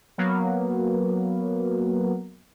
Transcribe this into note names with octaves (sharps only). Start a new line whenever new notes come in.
F#3 A#3 B3